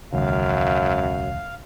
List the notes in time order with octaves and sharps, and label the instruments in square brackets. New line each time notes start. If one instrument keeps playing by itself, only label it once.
[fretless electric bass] E1 C#2 D#3 [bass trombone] F#2 [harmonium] F5